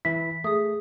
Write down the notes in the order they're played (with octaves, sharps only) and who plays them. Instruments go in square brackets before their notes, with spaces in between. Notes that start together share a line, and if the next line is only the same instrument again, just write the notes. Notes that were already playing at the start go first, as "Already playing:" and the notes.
[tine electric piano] E3 E4 [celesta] B6
[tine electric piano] A3 [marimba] G#4 D#6